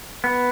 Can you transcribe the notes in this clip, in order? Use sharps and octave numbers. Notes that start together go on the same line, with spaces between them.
B3